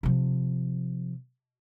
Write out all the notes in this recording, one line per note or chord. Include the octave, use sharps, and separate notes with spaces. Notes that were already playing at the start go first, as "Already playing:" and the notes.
C3 F3